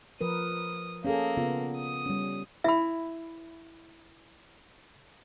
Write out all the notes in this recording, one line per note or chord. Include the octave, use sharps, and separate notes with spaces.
F3 A#4 B4 D#6
A#3 C#4 G#4 A4
C#3 B3 F4
D#6
G3 C#4
E4 E5 B5